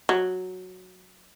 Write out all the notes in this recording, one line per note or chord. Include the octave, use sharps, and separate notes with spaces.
F#3